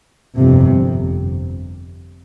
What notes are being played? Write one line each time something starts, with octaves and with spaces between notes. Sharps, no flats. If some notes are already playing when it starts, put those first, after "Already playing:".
G1 F2 C3